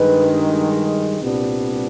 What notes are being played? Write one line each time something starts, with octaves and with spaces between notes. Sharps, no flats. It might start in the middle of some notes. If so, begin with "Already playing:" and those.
Already playing: G2 D#3 G#3 B4
C2 A#2 G3 B3 D4